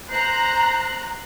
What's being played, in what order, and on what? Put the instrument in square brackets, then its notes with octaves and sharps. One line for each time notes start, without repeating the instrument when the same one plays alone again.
[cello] C5 [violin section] A#5 F#6